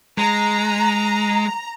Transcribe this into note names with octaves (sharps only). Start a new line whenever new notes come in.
G#3 A#5